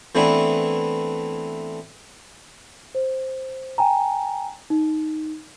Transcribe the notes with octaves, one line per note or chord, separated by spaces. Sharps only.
E3 A3 B3 C4 D4 E4
C5
G5 G#5 A#5
D#4